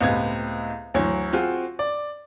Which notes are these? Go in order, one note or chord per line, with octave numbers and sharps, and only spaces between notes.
C#2 A2 B3 C4 G4 G#6
D2 E3 F#3 C#5
C4 F4 F#4 G#4
D5